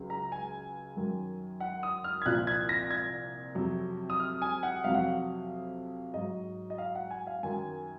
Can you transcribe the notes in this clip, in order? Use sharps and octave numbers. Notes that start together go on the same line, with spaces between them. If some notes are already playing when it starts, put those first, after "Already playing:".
Already playing: C#2 C#3 F#3
A#5
G#5
F#2 D#3 F#3
F#5
D#6
F6
G#6
C2 A#2 F3 F#6
G#6
A#6
G#6
F2 C3 F#3
D#6
F6
G#5
F#5
F2 C3 F#3 F5
F#5
F5
G#2 F#3 D#5
D#5
F5
F#5
G#5
F5
F#2 D#3 F#3 G#5